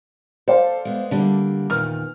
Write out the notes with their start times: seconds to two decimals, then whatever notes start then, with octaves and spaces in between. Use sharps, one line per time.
0.48 A4 C5 D5 F5
0.85 G#3 B3
1.11 D3 G3 A#3 D4
1.70 E2 A#2 D#3 F6